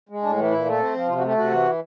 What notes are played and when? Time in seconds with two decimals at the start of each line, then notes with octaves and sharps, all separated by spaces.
0.09 G#3
0.23 A2 D4
0.37 E3
0.51 A#2 E4
0.65 A3
0.79 C4
0.94 F3
1.08 C3 F4
1.18 F#4
1.23 A3 G4
1.37 C3 F#4
1.50 E3